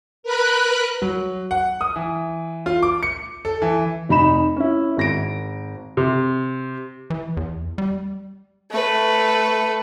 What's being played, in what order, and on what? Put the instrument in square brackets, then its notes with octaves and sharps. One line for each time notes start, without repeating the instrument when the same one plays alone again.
[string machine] A#4 B4 B5 F#6
[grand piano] F#3
F#5
D#6
E3
F4
D6
C#7
A4
E3
[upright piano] F1 D#4 B5 E7
C#4 E4
G#1 A#6 D7
[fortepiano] C3
[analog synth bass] E3
E2
G3
[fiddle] A3 B4